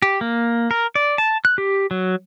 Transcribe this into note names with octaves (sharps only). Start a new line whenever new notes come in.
G4
A#3
A#4
D5
A5
F#6
G4
F#3